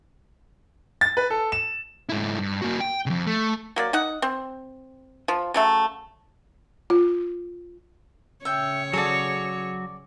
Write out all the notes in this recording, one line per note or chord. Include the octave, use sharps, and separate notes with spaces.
A6
B4
A4
E7
G#2 E4
G2
A#3 F#4
G5
F2 C#3
A3
F#3 A#3 D5
D#4 F#5
C4
F3
C#3 F#3 A3
F4
C#3 C#5 E5 G5
F#3 F#4 G#4 A4 D5